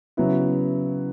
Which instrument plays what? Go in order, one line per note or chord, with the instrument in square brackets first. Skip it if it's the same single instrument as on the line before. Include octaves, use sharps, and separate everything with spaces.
[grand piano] C#3 F#3 B3 E4